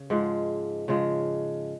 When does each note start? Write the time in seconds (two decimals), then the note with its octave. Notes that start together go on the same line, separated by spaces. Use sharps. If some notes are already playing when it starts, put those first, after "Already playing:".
Already playing: C#3
0.10 G#2 F3 G#3
0.88 C#3 F3 G#3